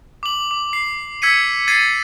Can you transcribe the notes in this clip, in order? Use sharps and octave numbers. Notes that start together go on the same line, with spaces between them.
D6 F#7
D6
C7
E6 G#6 B6 C#7 D#7
G#6 A6 C7 D#7